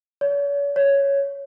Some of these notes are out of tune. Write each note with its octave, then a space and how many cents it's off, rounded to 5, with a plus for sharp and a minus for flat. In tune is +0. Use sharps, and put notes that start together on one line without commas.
C#5 +40
C#5 +5